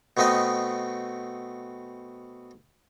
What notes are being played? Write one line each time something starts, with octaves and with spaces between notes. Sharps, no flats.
B2 A3 B3 C4 D#5